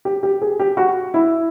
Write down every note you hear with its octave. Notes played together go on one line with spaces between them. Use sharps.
G4
G4
G#4
G4
F#4
E4